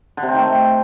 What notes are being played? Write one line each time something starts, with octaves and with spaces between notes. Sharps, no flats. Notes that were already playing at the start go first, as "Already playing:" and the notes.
D3
C3
C4
D#3
A3